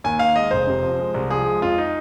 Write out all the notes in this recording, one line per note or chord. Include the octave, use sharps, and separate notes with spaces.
D#2 G#5
D#3 F5
G#3 D#5
F1 C5
C3
F3
G#3
C2
F3 G#4
G#3
F2 F4
D#4